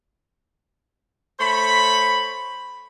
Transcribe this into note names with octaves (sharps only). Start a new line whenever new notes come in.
A3 C5 C#5 B5